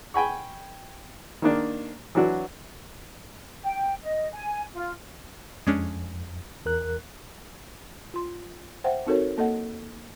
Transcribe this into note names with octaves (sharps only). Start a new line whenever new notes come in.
G5 G#5 B5 C#6
D#3 A#3 D4
E3 F#3 D4 F#4
G5
D#5
G#5
F4
F2 G#3 C#4 D4
E2 A#4 F#6
F4 C6
C5 E5 F#5 G5
C4 D#4 F#4 A4 A#4 C#5
A#3 A4 D#5 F#5